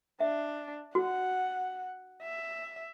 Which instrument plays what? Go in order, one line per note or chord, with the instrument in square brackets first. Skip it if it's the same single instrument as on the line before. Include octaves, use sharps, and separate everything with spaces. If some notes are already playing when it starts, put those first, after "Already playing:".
[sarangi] D4 [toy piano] E5
[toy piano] F#4 [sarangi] F#5
[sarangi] E5